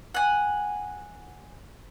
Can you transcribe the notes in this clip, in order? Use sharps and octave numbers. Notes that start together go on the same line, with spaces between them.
F#5 G#5